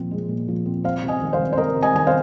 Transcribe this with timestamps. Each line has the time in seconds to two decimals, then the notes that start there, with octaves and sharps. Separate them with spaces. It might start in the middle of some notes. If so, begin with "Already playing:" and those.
Already playing: A#2 F3 C4
0.11 G#3
0.29 A#2
0.48 F3
0.65 C4
0.84 C4 C5 F5
1.03 C3
1.08 D#5 G#5
1.22 D#3
1.33 C5 F5
1.39 C3
1.53 C5
1.57 C4 A#4 D#5
1.76 C3
1.83 D#5 G#5
1.95 D#3 G#5
2.07 C5 F5